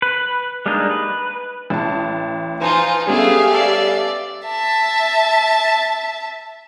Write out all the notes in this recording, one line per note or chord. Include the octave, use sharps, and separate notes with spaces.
B4
G3 G#3 A#3 D4 D#4
B4
A1 A5
F3 D#4 F4 B4 G#5
G3 A3 B3 C#4 G4 G#4 E5 F5
A4 D5
E5 A5